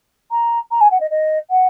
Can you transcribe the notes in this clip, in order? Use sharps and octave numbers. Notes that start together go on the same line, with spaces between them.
A#5
A#5
G#5
F#5
D#5
D#5
F#5